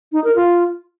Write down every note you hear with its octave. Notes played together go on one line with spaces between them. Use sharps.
D#4
A#4
F4